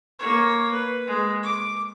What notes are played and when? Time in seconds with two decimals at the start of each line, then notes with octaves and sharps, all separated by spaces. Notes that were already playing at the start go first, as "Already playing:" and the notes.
0.19 A#3 C#5
0.72 B4
1.08 G#3
1.43 D6